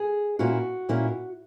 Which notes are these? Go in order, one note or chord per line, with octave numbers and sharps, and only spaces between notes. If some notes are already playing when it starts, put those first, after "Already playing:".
Already playing: G#4
A#2 A#3 C#4 E4 F#4
A#2 A#3 C#4 E4